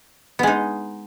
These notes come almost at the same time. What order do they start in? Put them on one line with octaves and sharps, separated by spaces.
B3 G#3 D#4